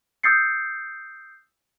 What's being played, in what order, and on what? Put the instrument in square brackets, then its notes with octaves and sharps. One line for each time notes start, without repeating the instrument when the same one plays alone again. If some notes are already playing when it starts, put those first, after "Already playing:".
[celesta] D#6 E6 G6 A6 C7 C#7